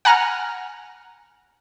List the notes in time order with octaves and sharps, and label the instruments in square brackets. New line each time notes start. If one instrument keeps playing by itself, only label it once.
[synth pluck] F#5 G#5 A#5 F6